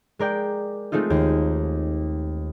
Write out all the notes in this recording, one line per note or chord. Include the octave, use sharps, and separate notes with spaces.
G#3 A#4 D5 G5
G#3 A3 C4 D#4 F4
D#2